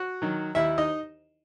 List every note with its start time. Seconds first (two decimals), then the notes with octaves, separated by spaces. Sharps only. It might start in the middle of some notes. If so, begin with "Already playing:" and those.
Already playing: F#4 F#5
0.22 D#3 F#3
0.55 D#2 E4 E5
0.78 D#4 D#5